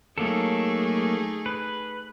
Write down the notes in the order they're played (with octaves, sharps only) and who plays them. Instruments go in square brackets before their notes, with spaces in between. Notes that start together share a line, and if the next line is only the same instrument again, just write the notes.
[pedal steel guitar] F#3 A#3 A4 [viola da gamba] A3 D#4 G#4
[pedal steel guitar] B4